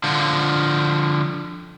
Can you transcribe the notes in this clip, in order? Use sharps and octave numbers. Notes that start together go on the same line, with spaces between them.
D3 F3